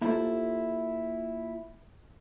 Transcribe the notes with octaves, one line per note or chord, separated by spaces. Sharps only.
A#3 E4 F4 G4 A4 C5